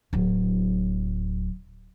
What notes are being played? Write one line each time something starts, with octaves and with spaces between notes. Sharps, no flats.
D1 F#3